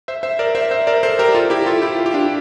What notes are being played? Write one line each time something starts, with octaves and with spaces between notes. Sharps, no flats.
C5 E5
C5 E5
A#4 D5
C5 E5
C5 E5
A#4 D5
A4 C5
G4 A#4
F4 A4
E4 G4
F4 A4
E4 G4
F4
G4
D4 F4